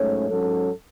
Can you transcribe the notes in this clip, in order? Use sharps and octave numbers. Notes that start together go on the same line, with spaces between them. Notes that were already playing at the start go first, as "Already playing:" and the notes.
Already playing: G#2 F#3 A3 C#4 C#5
G#2 F#3 C#4 A4